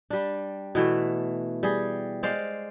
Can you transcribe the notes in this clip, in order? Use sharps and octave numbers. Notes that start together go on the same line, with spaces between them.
G3 D4
B2 E3 A3
G3 G#4
G#3 C5 D5 F5